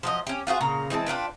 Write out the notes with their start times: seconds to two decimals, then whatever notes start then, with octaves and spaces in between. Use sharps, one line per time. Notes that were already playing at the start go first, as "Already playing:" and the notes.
0.03 F3 F#3 D#5
0.27 C#4 G4
0.47 F4 F#4 G#4 C5
0.61 A#2 C#3 A#5
0.90 E3 G#3 C4 A5
1.06 D4 F4 B4 G5